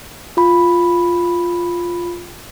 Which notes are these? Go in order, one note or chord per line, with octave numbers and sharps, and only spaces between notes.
F4 B5